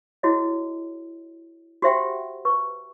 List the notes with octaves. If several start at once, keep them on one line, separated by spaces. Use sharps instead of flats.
E4 F#4 G#4 C#5 D#5
F#4 G4 C5 E5 F#5 G5
B4 C#6